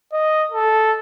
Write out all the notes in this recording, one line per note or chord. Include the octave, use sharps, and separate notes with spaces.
D#5
A4